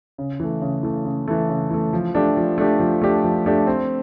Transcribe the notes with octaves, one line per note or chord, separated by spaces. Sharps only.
C#3
E3 A3
C#3
E3 A3
C#3
E3 A3
C#3
E3 A3
F3
A3 D4 G4
F3
A3 D4 G4
F3
A3 D4 G4
F3
A3 D4 G4
C4